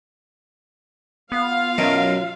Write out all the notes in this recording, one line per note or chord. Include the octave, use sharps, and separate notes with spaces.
B3 F4 F5
F#2 B2 F#3